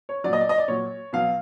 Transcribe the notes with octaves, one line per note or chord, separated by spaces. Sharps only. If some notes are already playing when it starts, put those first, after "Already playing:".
C#5
A#2 F#3 D5 D#5
D5
D#5
D5
A#2 F#3 C#5
B2 F#3 F5